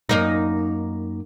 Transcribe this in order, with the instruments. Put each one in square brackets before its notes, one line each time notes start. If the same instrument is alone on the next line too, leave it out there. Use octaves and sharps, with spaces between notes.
[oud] F#2 A#3 D#4